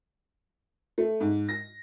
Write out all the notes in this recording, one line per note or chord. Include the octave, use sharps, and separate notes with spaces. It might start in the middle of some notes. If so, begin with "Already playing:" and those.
A3
G#2
A#6